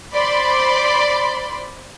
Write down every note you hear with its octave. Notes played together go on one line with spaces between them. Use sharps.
C5 D5 B5 C6